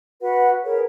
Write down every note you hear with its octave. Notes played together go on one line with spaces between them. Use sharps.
F#4 B4 F#5
G#4 A#4 B4 C#5